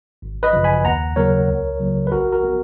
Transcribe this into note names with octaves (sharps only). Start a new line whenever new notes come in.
G#1
B4 D#5
F#2 C#3 F3
G#5 B5
D#2 F#5 A#5
C#3 F#3 A#3 A#4 C#5
C#2
C#3 F#3 A#3
B4
A#1 F#4 A#4
F#4 A#4
F3 B3